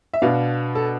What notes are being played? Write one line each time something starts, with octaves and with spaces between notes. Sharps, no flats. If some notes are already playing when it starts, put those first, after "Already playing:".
E5
B2 B3 D4 F5
A4